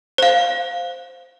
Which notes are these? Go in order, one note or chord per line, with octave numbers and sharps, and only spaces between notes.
C5 F5